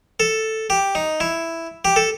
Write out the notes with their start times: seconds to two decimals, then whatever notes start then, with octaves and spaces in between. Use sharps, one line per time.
0.20 A4
0.70 G4
0.95 D#4
1.20 E4
1.85 G4
1.96 A4